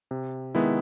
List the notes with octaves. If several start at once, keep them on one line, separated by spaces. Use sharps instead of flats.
C3
D#3 G#3 B3 E4